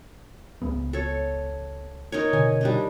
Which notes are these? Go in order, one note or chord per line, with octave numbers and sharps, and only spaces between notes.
C#2 G#3 B3
A4 C#5
D#4 A#4 C#5
B2 D3 G#5
G3 D4 D#4